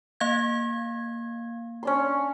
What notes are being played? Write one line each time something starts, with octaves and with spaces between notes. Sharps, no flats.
A#3 F5 G#6
C#4 D4 C6